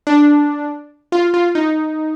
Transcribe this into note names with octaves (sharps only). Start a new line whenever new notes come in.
D4
F4
F4
D#4